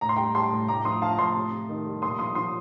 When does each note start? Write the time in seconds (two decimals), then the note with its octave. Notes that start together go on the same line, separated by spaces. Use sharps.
0.01 A2 A#5
0.09 C6
0.16 G3 G5 A#5
0.34 G3 A5 C6
0.52 A2
0.68 A2 A#5 D6
0.85 F3 C6 D#6
1.02 F3 F5 A5
1.19 A2 A5 C6
1.36 C3
1.52 C3
1.69 D#3
1.86 G3
2.02 A#2 C6 D#6
2.19 F3 C6 D#6
2.35 F3 C6 D#6